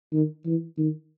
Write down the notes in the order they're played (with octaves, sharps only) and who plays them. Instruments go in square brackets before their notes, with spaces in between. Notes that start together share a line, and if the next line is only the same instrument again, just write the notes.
[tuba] D#3
E3
D#3